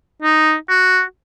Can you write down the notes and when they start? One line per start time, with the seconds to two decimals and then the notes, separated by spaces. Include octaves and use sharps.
0.22 D#4
0.69 F#4